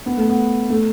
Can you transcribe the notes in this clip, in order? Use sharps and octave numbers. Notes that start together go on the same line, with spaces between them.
B3
A3
B3
A3